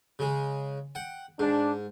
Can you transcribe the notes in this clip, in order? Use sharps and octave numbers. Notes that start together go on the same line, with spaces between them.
C#3 G#3
F#5 G5
G#2 D4